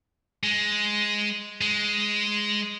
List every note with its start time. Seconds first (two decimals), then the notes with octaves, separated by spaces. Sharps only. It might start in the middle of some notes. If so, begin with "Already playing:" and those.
0.44 G#3
1.61 G#3